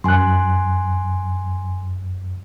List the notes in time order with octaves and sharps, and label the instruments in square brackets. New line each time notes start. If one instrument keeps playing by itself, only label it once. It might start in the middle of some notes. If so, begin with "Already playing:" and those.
[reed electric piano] F#2 F#6 [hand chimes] G#5 C6